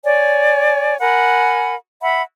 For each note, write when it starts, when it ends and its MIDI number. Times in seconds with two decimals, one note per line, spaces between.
0.04 0.96 73
0.04 0.96 74
0.04 0.96 80
1.01 1.75 70
1.01 1.75 78
1.01 1.75 80
1.01 1.75 83
2.01 2.22 76
2.01 2.22 78
2.01 2.22 83